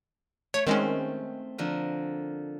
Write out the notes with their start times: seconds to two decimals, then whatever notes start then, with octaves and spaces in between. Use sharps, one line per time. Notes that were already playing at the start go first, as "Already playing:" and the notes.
0.54 A3 C#5
0.67 D#3 G#3 C4 C#4 C5
1.58 D3 F3 A#4